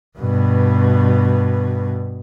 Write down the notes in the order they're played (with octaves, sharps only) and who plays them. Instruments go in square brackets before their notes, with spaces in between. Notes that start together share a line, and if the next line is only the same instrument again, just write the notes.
[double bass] G2 B2